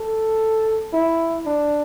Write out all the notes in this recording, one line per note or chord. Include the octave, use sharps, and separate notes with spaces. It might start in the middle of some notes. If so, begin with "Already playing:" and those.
Already playing: A4
E4
D4